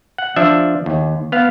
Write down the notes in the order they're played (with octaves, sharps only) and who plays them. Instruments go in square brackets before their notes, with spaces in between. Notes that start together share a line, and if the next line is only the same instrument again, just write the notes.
[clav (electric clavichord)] F#5
F3 D4 E5
D#2
B3 F5